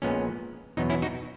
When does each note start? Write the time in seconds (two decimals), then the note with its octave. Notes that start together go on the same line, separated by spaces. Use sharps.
0.02 A#1 A#2 G#3 B3 C#4
0.77 E2 B2 F#3 B3 D#4
0.90 C#4 E4
1.02 D#4 F#4